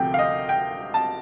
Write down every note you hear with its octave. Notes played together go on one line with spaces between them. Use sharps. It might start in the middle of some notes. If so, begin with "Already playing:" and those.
Already playing: D2 C3 F3 A3 G5
F5
D#5
G5
A5